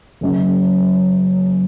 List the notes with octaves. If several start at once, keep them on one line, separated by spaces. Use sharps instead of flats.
F#1 F#2 C#3